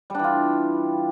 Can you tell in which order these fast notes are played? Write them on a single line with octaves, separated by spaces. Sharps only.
G3 D4 E3 F4